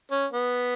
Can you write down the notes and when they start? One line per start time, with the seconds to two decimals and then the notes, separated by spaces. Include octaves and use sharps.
0.11 C#4
0.33 B3